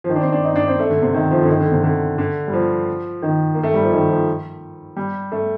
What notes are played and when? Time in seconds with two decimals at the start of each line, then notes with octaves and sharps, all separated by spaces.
0.04 F3
0.09 D#3
0.16 D4
0.21 C4
0.32 D4
0.44 D#4
0.56 D4
0.68 C4
0.79 A3
0.90 D3
1.02 C3
1.14 D#3
1.31 F3
1.43 D3
1.49 D#3
1.60 D3
1.72 C3
1.84 D3
2.18 D3
2.48 G3
2.53 F3
3.22 D#3
3.55 A#3
3.63 A3
3.74 G3
3.83 F3
3.92 D#3
4.09 F3
4.97 G3
5.32 A3